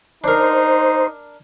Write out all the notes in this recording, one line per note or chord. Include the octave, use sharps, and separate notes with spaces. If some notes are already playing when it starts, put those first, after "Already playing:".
D4 D#4 A#4 C5